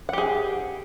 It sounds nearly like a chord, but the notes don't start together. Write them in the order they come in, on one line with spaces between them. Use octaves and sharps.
F#5 G4 G#4